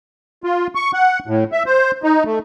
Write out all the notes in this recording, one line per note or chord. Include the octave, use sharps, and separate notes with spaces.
F4
C#6
F#5
A2
E5
C5
D#4
A3